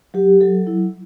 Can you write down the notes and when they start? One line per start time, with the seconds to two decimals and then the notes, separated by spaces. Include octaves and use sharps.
0.14 F#3 G4
0.41 F#3 A4
0.67 E4